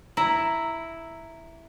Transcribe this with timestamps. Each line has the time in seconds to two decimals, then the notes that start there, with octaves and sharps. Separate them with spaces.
0.17 E4 A#5